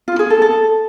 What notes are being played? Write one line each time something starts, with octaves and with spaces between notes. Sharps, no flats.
F4
G#4
A4
A4